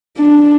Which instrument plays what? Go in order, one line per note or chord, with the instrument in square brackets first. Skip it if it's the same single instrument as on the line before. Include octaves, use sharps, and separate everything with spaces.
[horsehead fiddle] D4